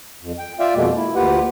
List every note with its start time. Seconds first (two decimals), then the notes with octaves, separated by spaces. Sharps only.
0.21 F2
0.39 G5
0.59 F4 D5 E5 F5 G5
0.75 F2 B2 G#3 A#3
0.97 E4
1.15 D2 A#3 F4 G4 B4 F#5